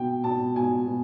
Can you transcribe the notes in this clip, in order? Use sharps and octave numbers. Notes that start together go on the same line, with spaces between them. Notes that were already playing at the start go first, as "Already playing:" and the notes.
Already playing: B2 G5
B2 A5
B2 G#5
B2